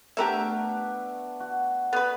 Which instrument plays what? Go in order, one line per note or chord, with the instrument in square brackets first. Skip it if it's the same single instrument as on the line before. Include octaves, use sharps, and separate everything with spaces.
[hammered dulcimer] A3 B3 D4 [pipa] G4 A#4 E5
[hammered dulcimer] F#4
[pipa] B3 B4